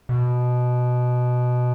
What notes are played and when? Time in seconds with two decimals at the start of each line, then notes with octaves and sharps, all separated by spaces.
0.09 B2